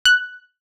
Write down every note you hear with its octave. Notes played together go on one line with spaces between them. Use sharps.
F#6